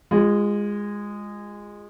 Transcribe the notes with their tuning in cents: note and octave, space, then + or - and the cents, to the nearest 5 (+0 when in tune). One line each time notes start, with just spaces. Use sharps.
G#3 -15 F4 +10